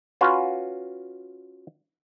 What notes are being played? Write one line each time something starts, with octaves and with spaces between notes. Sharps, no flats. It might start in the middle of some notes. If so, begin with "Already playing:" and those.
C#4 F4 F#4 B4